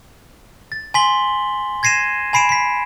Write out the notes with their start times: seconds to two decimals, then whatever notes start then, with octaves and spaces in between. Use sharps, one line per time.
0.72 A6
0.94 G#5 C6 B6 F#7 G7
1.83 G#6 A#6 C7 D#7 E7
2.33 G#5 B5 C7 D7 E7
2.49 B6 C7